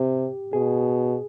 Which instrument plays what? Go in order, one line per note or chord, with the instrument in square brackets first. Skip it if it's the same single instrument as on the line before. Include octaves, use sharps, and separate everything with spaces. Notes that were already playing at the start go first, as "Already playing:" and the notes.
Already playing: [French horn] C3 [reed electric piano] G4
[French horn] B2 [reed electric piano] G#4